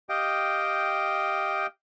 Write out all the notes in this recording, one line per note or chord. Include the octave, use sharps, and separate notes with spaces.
G4 D#5 F5 G5